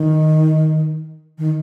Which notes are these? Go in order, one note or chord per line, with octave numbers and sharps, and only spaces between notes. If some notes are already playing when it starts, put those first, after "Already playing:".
Already playing: D#3
D#3